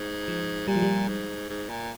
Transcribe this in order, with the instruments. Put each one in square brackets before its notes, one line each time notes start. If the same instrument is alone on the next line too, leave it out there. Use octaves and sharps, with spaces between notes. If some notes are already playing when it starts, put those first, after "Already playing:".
Already playing: [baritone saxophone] G#2
[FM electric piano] F3
[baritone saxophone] A#2 [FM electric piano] G3
[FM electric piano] F3
G3
[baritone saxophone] G#2
G#2
A#2